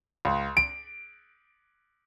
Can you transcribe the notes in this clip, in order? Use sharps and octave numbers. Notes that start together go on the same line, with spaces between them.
C#2
D7